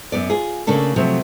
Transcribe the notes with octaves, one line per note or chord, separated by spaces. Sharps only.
F#2 B3 D5
F4 G#4
C#3 A3 A#3 D4 A4
C3 F3 F#3 A3